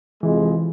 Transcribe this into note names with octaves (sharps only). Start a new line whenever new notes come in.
F2 C3 E3 F3 G#3